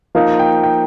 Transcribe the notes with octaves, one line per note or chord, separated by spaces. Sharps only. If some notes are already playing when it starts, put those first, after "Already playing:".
F3 A#3 D#4 F5
G5
G5